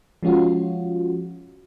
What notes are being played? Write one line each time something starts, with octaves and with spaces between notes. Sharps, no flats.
F3 G#3 C#4 F4 F#4